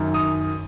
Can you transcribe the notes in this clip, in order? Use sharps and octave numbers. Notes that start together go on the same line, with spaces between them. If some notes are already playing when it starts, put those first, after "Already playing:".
Already playing: F#2 D#3
D#6